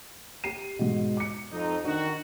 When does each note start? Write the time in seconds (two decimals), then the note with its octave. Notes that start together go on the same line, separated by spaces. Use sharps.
0.44 G4 C7 D#7
0.79 G#2 B2
1.17 D6 C#7
1.52 F2 D#4
1.84 D#3 D4 F#4